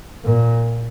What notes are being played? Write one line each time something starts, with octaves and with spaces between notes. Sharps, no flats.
A#2